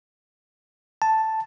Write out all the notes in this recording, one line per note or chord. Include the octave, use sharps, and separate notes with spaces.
A5